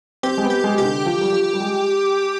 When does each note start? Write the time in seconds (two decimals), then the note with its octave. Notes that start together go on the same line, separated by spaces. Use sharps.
0.23 C4 G4
0.38 G#3
0.44 B3
0.50 G4
0.64 G#3
0.78 C3 G4
0.84 D3
1.06 F3
1.21 G3
1.33 F3
1.54 G3
1.60 G#3